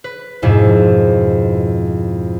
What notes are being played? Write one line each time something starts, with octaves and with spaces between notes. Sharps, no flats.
B4
F2 G#2 B2 E4